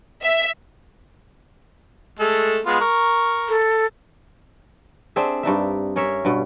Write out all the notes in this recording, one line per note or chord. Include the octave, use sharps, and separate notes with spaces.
E5
G#3 A3 A4
G#3 B3 F4
A#4 C#6
A4
C4 D4 G#4 E5
G2 D4 D#4 E5
C#4 A#4 C#5 E5
G2 B2